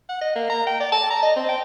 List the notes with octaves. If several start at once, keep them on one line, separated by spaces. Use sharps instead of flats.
F#5
D#5
A#3
A#5
G5
D5
A5
A#5
D#5
C4
G5